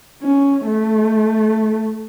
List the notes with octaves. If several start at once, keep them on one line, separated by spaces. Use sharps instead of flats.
C#4
A3